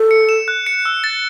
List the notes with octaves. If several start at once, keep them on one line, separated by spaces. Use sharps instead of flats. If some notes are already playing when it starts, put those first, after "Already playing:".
Already playing: A4
C#7
E7
F#6
C#7
E6
A6